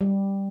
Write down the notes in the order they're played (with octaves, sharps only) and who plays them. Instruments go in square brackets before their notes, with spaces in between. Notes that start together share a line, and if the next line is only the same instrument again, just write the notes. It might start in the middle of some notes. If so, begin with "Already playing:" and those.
[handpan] G3